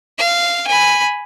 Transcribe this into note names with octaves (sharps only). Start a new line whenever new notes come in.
F5
G#5 B5